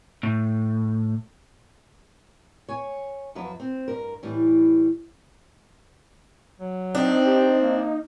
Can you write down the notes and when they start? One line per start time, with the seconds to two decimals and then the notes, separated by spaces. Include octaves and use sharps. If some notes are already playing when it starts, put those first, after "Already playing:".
0.23 A2
2.69 C#5 G#5
3.35 F#2 F3 F#3 B4
3.60 C4
3.88 G2 A#4
4.23 A2 E3 G3
6.60 F#3
6.95 C4 D4 D#4
7.26 G4
7.59 A#3